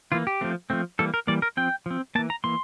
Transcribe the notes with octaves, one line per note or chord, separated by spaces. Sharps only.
E3 A#3 F4
G4
F3 A3 C4
F3 A3 C4
E3 G3 A#3 A4
A#4
E3 G3 A#3 D5
A#4
F3 C4 G5
F3 C4
E3 A#3 A5
A#5
E3 A#3 C6